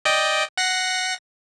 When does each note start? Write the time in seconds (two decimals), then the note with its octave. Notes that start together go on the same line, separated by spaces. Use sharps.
0.05 D5 D#5 G5
0.57 F#5 A#6 C7